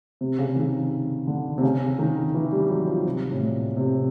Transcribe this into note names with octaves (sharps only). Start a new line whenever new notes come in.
C3
C#3
D#3
D3
C3
C#3
D#3
E3
G3
F#3
F3
C3
A2
A#2
C3